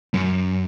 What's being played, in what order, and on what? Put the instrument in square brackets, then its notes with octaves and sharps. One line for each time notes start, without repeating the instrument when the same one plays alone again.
[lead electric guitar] F#2